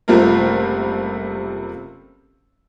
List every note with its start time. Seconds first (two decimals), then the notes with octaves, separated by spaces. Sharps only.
0.08 F#1 C3 G3 A3 F4 A#4